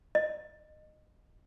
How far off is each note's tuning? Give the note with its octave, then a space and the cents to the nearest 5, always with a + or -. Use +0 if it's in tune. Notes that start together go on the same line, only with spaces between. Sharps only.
D#5 -20